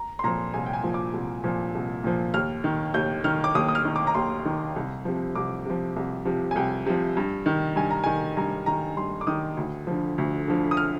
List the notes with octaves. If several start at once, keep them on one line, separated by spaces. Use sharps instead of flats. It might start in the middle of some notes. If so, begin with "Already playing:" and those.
Already playing: A#5
C6
A#2 F3 A#5
C2 G#5
G5
G#5
A#2 F3
D6
C2
A#2 F3
C2
A#2 F3
D#2 F6
D#3
D#2 G6
D#3 F6
D6
D#2 D#6
D#6
F6
D#3
D6
A#5
D#2 C6
D#3
C2
C3 F3
C2 D6
C3 F3
C2
C3 F3
G#5
C2 G5
C3 F3
G2
D#3
G2 G#5
A#5
D#3 G#5
G2 A#5
D#3 A#5
G2 C6
D6
D#3 D#6
D2
D3 F3
D2
D3 F3
D#6
F6